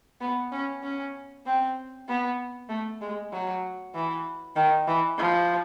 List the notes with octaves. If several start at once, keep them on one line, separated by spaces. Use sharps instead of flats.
B3
C#4
C#4
C4
B3
A3
G#3
F#3
E3
D#3
E3
F3